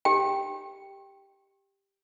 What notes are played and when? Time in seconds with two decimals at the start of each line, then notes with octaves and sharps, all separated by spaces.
0.05 G4 G5